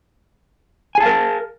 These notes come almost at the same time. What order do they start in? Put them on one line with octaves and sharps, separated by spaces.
G#5 G#4 A5 F5 A#4